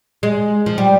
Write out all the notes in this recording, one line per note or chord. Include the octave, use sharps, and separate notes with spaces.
G#3
F3
G3